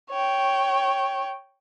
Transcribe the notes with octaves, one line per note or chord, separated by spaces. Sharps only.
C#5 G5